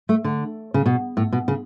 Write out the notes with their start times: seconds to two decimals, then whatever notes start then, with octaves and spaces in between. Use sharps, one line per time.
0.09 A3
0.24 D3
0.74 C#3
0.86 B2
1.17 A2
1.33 B2
1.48 C#3